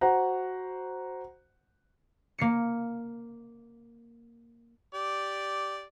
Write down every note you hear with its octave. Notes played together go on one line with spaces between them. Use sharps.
F#4 C5 F#5 A#5
A#3 C7 C#7
G4 D5